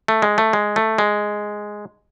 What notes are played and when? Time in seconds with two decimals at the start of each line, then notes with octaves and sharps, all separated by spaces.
0.08 A3
0.22 G#3
0.38 A3
0.53 G#3
0.76 A3
0.98 G#3